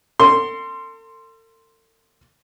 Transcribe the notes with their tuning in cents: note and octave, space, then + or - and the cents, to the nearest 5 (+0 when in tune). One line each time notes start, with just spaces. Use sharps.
A4 +40 C6 +0